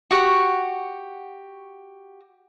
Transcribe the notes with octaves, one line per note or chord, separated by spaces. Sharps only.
F#4 G4 F#5 C#6